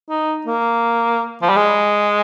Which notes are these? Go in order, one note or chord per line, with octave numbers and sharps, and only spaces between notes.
D#4
A#3
F3
G3
G#3